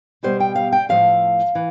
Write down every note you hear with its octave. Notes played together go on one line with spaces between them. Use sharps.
B2 G3 B3 C5
G5
F5
G5
A2 F3 A3 F5
E3